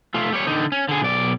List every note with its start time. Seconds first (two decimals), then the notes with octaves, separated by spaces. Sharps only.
0.14 A3 F4
0.32 G3 C#5
0.47 D3 D#4
0.72 C#4
0.89 D3 G#4
1.02 B1 D5